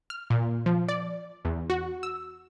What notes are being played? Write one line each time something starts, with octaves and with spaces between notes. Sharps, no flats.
F6
A#2
F3
D5
E2
F#4
E6